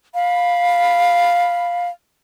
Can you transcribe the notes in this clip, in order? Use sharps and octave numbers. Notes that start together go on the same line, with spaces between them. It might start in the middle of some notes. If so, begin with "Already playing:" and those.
F5 B5